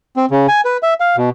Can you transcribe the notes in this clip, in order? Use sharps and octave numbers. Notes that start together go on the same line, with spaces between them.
C4
C#3
G#5
B4
E5
F5
B2